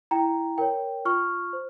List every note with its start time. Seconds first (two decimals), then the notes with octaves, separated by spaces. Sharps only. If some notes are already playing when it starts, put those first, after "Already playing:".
0.11 E4 G5 A#5
0.58 A#4 C#5 G5
1.05 F4 C#6 F6
1.53 C5